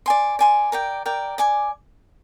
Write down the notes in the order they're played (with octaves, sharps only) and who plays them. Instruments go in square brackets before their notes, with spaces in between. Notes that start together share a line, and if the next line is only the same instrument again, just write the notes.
[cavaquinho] D5 G#5 C6
D5 G#5 C6
A#4 D5 G5
A#4 D5 G5
D5 G#5 D6